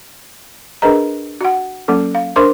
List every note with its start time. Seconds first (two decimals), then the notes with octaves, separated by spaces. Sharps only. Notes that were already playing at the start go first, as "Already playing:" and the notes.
0.82 D4 G#4 A#4 B4 D#5 A#5
1.41 F#4 F#5
1.88 F#3 A#3 C#4 A4
2.15 F5
2.36 D4 A#4 C5 C6 D6